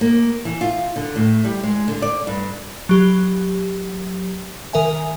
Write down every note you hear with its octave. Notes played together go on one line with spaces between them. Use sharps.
A#3
E3
F4
D3
A2
G3
G#3
D3
D5
G2
F#3 G4
D#3 A#4 E5 G#5